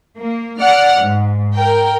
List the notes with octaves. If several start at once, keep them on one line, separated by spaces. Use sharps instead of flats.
A#3
D5 F#5 F6
G#2
A#4 G5